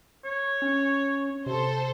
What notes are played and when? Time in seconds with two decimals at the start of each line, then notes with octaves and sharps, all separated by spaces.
0.24 C#5
0.62 C#4
1.46 C3 A4 C5